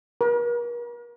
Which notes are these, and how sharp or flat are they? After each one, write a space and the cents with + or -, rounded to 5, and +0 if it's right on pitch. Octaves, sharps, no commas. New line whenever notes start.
A#4 +45